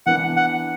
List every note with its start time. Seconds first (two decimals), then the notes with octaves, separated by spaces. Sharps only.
0.06 E3 B3 D4 F#5
0.37 F#5